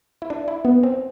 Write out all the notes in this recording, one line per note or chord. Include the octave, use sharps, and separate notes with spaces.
E4
D4
E4
B3
C4